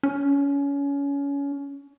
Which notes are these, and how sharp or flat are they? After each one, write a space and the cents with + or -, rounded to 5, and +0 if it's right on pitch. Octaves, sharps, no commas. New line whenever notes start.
C#4 +25